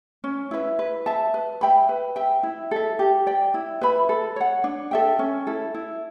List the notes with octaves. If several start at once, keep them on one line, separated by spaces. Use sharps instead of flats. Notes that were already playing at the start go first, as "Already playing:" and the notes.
C#4
E4 B4 E5
B4
E5 A5
B4
E5 G5 B5
B4
E5 G5
E4
A4 E5
G4
D5 G5
E4
B4 E5 B5
A4
C#5 F#5
D4
A4 E5 G5
C#4
E4 A4
E4